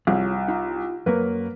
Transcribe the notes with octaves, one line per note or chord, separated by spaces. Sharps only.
C2 F4 G#4 C#5
D#4 F4 A#5
F#2 F#3 A#3 B4 C#5